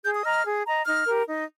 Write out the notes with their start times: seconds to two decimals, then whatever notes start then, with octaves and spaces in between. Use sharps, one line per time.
0.05 G#4 G6
0.15 D#6
0.25 D#5 A#5 F6
0.46 G#4
0.66 D#5 A#5
0.86 D#4 F6
1.06 G4 A#4
1.27 D#4